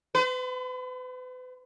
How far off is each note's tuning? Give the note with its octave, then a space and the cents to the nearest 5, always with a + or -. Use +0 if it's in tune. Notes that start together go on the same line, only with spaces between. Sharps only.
B4 +40